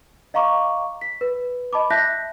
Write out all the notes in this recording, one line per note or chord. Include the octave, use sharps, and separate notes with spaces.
D#5 F5 A#5 C#6 D6
B6
B4
D#5 A5 B5 D6
E5 A5 F#6 G6 A#6 B6